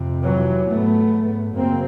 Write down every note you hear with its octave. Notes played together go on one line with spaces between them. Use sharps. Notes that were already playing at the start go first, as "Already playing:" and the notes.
Already playing: F2 C3
E3 F#3
G#2 A3 B3
F#2 C#3 A#3 C4